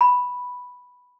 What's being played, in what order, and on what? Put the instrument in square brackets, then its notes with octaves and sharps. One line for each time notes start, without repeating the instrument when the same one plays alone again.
[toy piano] B5